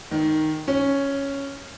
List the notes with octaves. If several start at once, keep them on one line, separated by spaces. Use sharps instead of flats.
D#3
C#4